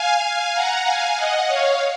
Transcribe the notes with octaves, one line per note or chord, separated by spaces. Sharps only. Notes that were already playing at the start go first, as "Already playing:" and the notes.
Already playing: F5 G#5
F#5 A#5
F5 G#5
D#5 F#5
C#5 F5